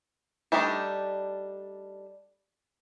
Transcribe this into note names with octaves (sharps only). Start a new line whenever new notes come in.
G3 A3 D4 D#4 G4